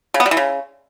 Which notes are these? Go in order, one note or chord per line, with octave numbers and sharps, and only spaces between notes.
C#3
B3
G3
E3
C#3